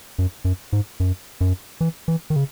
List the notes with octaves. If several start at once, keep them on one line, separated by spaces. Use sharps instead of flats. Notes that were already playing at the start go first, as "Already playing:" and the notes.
F#2
F#2
G#2
F#2
F#2
E3
E3
D#3
C#3